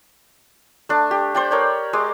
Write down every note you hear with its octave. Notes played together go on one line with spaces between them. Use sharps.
A3 D4
G4
C5 D5 G5
A#4 C#5 D5
G#3 D5